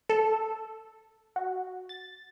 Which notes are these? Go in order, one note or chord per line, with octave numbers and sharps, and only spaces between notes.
A4
F#4
A6